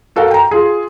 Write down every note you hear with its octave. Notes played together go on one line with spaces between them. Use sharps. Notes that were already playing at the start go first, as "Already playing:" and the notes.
F#4 A4 A#4 F5 F#5
G5 A#5
F4 G#4